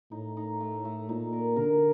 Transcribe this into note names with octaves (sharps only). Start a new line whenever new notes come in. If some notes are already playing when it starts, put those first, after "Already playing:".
A2 D#4
D#4
A3
A3
A#2 D#4
A#4
D3 A#4